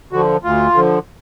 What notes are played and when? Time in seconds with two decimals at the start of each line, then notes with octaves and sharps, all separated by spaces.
0.12 D3 F3 F#4
0.44 D2 F4
0.75 D3 F3